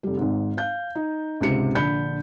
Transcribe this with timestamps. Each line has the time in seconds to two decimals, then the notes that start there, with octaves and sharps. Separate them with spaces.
0.03 F1 G3
0.17 G#1 G#2
0.57 F5 G6
0.95 D#4
1.41 C#2 G#2 C3 G4 C#7
1.75 A#1 D3 B5 G6 C#7